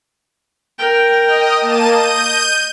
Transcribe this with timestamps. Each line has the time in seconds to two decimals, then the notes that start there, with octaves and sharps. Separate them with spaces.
0.79 A#4 G5
1.27 D#5
1.61 A#3 A5 D#7
1.92 D#5 G6 D#7